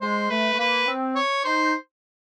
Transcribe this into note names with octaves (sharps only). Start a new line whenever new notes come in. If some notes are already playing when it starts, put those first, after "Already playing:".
G#3 C5
A3 B4
A3
A#3 B4
C4
C#5
D#4 C5